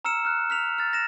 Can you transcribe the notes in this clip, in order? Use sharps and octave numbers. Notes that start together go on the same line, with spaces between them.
A#5 E6 F6 C#7 E7
F6 F#6
F6 B6 F7
F6 A6
A#6 E7